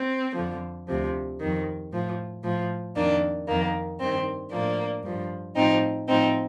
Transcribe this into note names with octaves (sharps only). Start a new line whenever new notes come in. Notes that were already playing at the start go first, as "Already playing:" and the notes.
Already playing: C4
F2 D3 F3
D2 C3 F3
F2 D#3
A2 F3
A2 F3
F2 D#3 A#3 D4
F2 D#3 A#3
G2 D#3 C4
A2 F3 A#3 D4
G2 F3
A2 F3 C4 D#4
A2 F3 C4 D#4